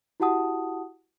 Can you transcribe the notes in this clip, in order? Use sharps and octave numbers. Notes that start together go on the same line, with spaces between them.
E4 F#4 G4 F#5 A5 D#6